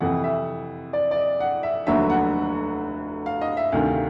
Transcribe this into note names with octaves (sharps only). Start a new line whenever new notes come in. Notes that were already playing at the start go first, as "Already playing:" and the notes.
F2 C3 E3 F#5
E5
D5
D5
D#5
F#5
E5
F1 D#2 D3 F#3 E5
F#5
F5
D#5
E5
D2 C3 D#3 F5